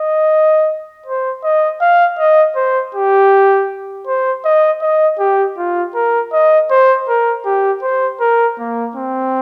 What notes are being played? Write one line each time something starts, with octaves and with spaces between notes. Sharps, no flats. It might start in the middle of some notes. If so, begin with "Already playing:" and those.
Already playing: D#5
C5
D#5
F5
D#5
C5
G4
C5
D#5
D#5
G4
F4
A#4
D#5
C5
A#4
G4
C5
A#4
A#3
C4